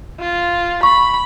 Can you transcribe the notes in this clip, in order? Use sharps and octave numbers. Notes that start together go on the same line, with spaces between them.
F4
B5 C#6